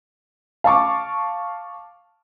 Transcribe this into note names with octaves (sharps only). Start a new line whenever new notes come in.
F5 A5 C#6 D6